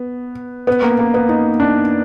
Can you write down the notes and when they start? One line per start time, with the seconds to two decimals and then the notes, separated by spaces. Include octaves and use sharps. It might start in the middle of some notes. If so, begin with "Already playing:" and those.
Already playing: B3
0.67 B3
0.82 A#3
0.99 A#3
1.14 B3
1.29 D#4
1.60 D4